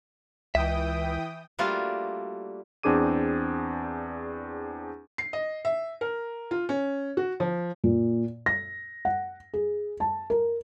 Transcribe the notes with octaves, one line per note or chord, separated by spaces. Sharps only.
C#2 E3 E5 G5 D#6
G3 A3 A#3 D4 F4 F#4
E2 C4 D4 G#4 D6 D#7
C7
D#5
E5
A#4
F4
C#4
F#4
F3
A#2
A#6
F#5
G#4
A5
A#4